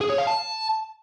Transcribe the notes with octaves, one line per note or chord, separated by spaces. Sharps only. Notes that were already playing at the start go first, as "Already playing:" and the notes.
G#4
C#5
F5
A5